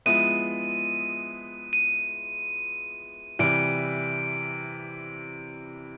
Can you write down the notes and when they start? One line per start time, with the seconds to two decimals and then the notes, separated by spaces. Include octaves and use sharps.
0.06 F3 G#3 B3 E4 D#7
1.73 D#7
3.39 C3 E3 G3 D7